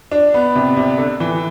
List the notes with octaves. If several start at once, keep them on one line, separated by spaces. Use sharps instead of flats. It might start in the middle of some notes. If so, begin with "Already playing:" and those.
D4
B3
C3
C3
D3
E3